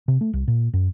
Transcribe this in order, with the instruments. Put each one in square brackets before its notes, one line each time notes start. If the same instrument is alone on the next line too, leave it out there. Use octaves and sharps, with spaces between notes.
[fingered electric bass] C3
A3
C2
A#2
F#2